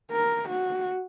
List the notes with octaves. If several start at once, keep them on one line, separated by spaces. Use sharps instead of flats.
A#4
F#4